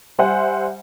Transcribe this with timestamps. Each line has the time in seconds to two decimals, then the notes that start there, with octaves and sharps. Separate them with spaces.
0.19 G3 C5 E5 F#5 G#5